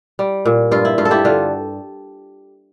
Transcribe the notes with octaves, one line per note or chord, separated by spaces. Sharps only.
G3
A#2
G2 F4
E4
G2 F4
A4
E4 G4
D3 F4